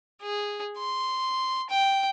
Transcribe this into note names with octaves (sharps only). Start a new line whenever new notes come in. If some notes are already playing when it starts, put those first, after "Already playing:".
G#4
C6
G5